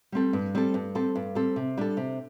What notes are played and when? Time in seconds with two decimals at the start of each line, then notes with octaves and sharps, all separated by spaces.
0.12 G3 C4 A4
0.33 G2
0.55 G3 C4 A4
0.74 G2
0.95 G3 C4 A4
1.15 G2
1.35 G3 C4 A4
1.56 C3
1.77 G3 D4 A4
1.97 C3